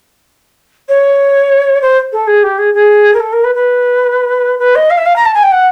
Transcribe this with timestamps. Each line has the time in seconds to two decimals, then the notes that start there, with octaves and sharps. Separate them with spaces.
0.88 C#5
1.81 C5
2.12 A4
2.27 G#4
2.43 G4
2.58 G#4
2.73 G#4
3.13 A#4
3.19 A4
3.32 A#4
3.44 B4
3.55 B4
4.58 B4
4.75 D#5
4.90 F5
4.97 E5
5.05 F5
5.16 A#5
5.25 A5
5.34 G#5
5.43 G5
5.51 F#5